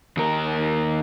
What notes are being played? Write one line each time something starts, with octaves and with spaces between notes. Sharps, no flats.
D#2 A#4